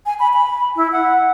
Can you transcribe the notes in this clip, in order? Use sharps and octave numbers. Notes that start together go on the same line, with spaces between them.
G#5
B5
B5
E4
F#5